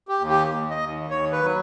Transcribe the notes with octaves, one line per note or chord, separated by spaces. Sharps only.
G4
D#2
G4
D#2
D#5
D#2
D#2 C#5
B4
F#3